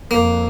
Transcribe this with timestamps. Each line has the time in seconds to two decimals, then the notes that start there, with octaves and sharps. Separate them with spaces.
0.11 F2 A#3